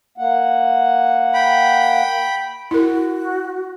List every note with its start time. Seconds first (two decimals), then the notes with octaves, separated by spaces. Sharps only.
0.18 A#3 F#5
1.34 G5 B5
2.71 E4 F#4 A#4